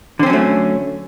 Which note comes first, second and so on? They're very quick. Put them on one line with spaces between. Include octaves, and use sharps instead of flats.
D3 C4 C#4 F#3 A3